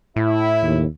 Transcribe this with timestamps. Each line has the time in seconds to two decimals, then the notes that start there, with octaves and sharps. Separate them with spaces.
0.16 A2 E4
0.63 D#2